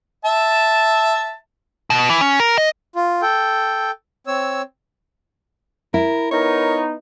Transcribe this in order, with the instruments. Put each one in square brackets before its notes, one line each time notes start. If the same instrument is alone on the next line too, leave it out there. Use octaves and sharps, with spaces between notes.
[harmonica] E5 A5
[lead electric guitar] B2
E3
C#4
A#4
D#5
[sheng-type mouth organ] F4
A4 G5
C4 C#5 E6
[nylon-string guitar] E4 [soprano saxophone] A#4
[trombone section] B3 D#4 [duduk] A#4 [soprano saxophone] C#5